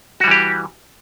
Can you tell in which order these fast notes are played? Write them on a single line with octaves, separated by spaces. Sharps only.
F#4 G3 E3 G4